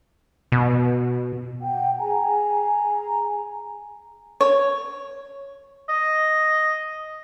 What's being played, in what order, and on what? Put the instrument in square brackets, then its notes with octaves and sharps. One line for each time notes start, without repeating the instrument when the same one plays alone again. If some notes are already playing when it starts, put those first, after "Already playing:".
[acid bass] B2
[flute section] F#5 G5
G#4 G#5 A#5
[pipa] C#5
[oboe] D#5